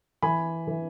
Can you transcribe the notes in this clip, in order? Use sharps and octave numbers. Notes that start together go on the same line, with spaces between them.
E3 G#5 B5
E3